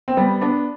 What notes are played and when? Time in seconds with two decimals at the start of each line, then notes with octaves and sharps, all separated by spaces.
0.08 C4
0.17 G3 B3
0.41 B3 D4